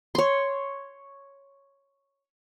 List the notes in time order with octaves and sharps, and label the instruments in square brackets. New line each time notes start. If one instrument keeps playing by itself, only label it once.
[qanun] C#5 C6